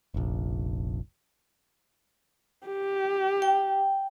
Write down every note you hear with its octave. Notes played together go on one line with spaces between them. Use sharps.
F1 A#1
G4
G5